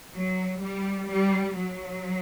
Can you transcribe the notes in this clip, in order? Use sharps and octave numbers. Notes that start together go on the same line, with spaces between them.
F#3
G3
G3
F#3